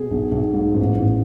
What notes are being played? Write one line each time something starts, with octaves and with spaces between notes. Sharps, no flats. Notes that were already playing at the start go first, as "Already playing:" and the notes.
Already playing: B2 G#4
B1
B1
G#2
A1
A1